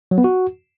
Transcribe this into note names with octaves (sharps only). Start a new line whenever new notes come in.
F#3
B3
F#4